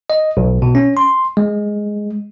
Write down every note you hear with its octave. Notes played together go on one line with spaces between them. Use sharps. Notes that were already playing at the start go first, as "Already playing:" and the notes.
D#5
B1
B2
C#4
C6
G#3